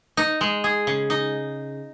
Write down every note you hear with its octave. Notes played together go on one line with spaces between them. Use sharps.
D#4
G#3
G#4
C#3
D#4